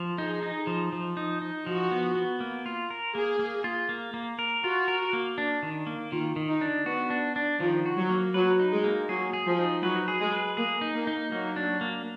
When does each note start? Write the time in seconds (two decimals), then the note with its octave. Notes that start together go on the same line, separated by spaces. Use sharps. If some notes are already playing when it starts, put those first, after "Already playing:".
Already playing: F3
0.18 D#4 G#4
0.43 D#4
0.67 F3
0.93 F3
1.17 D#4
1.42 D#4
1.67 F3 F#4
1.91 B3
2.15 B3
2.40 A#3
2.66 F4
2.90 A#4
3.15 A#3 G#4
3.39 A#3
3.64 F4
3.89 A#3
4.14 A#3
4.39 A#4
4.63 F4 F#4
4.88 A#4
5.13 A#3
5.38 D4
5.63 D#3
5.87 A#3
6.11 D#3 F4
6.36 D#3
6.48 D#4
6.61 D4
6.86 B3 F#4
7.10 D4
7.36 D4
7.60 D#3 F3
7.86 F#4
7.97 F#3
8.10 A#3
8.34 F#3 B4
8.60 D#4
8.72 G#3
8.84 A#3
9.09 F#3 G#4
9.33 G#4
9.46 F3
9.59 D#4
9.82 F#3 B4
10.08 G#4
10.20 G#3
10.32 B4
10.57 A#3 G#4
10.81 D#4
10.94 A#3
11.07 D#4
11.31 F#3 A#3
11.56 D4
11.81 A#3